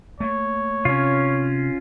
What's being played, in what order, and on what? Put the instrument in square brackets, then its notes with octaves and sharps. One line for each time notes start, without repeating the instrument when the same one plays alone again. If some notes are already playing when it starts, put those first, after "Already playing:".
[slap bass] A3 A#3 [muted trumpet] C#5
[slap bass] C3 [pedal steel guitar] C#4 F4